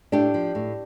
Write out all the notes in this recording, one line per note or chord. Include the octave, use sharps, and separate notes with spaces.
A2 D4 G4
F3
A2